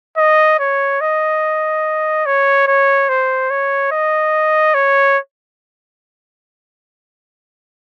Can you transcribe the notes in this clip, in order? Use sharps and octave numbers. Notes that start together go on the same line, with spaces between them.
D#5
C#5
D#5
C#5
C#5
C5
C#5
D#5
C#5